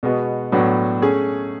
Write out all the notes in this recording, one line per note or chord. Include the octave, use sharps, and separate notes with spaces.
B2 G#3 B3 F#4
A2 F#3 B3 D4 F#4
A3 C#4 G#4